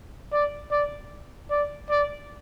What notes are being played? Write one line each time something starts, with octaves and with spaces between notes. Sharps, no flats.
D5
D5
D5
D5